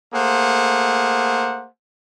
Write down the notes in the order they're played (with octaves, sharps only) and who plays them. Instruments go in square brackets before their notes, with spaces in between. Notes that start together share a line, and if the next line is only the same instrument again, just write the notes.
[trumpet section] A3 A#3 G#4 C5 F#5